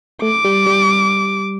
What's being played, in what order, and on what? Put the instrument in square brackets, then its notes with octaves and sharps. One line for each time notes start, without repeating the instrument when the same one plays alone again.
[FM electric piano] A3 [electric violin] D6
[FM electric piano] G3
G3